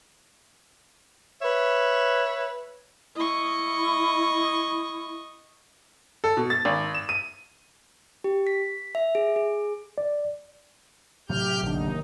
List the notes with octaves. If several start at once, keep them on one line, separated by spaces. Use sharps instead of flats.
B4 C#5 E5
E4 D#5 C#6
A4
B2
A6
G#1
E7
D#7
G4
B6
E5
G#4
G#4
D5
A2 C3 F#3 G4 F6 G6
A1 D#2 D3 D#4